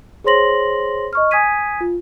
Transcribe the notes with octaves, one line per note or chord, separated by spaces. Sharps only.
G#4 C5 C#5 C6 A#6 F#7
D#5 C#6 F6
G#5 D#6 G#6 B6 D#7
F4